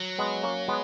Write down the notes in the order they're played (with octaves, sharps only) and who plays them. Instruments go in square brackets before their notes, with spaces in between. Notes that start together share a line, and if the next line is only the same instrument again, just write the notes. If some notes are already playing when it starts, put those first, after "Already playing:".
Already playing: [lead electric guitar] F#3
[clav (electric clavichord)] G#3 B3
A#3 C#4
G#3 B3